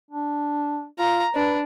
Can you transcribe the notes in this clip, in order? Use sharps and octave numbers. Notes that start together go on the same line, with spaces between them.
D4
F4 A#5
D4 B4